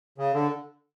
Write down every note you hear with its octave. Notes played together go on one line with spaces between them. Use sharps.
C#3
D3